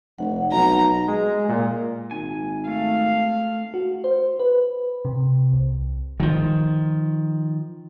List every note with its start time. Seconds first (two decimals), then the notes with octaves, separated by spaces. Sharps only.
0.18 F1 F#5
0.52 B1 A#5
1.07 G#3
1.48 A#2
2.11 G#1 G#5
2.68 A3 F5
3.74 F#4
4.04 C5
4.39 B4
5.05 C3
5.53 C2
6.20 D#3 F3